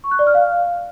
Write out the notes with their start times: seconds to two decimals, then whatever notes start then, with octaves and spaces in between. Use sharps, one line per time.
0.04 C#6
0.11 F#6
0.19 D5
0.27 F6
0.34 F5